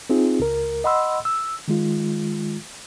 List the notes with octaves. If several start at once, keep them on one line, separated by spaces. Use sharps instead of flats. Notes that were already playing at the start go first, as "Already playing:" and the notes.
C4 D#4 F4 G#4
C#2 A#4
D#5 F#5 B5 C6 E6
E6
D#3 G#3 F4